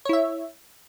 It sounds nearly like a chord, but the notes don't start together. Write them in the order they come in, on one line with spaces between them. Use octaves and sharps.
C#5 E4 E5